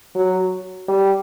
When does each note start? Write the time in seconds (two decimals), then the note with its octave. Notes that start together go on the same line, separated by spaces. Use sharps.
0.15 F#3
0.88 G3